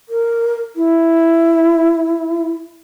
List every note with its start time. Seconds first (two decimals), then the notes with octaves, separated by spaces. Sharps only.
0.09 A#4
0.76 E4